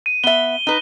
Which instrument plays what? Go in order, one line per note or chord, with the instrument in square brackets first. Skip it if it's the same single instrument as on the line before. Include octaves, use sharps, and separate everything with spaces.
[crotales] D#7
[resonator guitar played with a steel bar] B3 E5 [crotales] G7
[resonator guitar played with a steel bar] D#4 B4